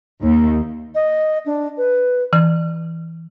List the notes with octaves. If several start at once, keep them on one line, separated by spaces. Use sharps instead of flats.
D#2
D#5
D4
B4
E3